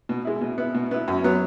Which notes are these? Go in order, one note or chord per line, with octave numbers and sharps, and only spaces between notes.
B2
G#3 E4
B2
B3 E4
B2
B3 E4
F#2
F#3 B3